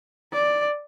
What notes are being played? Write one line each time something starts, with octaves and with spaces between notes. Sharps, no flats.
D5